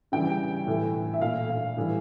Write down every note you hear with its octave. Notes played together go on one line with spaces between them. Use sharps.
C#3 E3 G3 G5
A2 E3 A3
E5
A#2 A3 F5
F5
A2 E3 G3